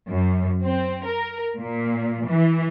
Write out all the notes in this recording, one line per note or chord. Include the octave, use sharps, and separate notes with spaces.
F#2
C4
A#4
A#2
E3